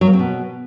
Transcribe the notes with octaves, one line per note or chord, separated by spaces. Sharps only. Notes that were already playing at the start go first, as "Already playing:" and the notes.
F#3
A#3
C4
B2